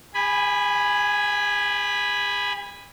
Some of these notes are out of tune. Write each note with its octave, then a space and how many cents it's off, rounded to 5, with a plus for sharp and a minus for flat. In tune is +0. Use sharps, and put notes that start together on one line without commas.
G#4 -45 G#5 +0 B5 +0